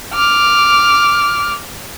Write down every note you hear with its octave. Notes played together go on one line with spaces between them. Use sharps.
D6 F6